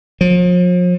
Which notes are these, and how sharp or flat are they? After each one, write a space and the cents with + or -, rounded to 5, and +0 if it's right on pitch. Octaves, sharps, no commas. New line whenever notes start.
F3 +40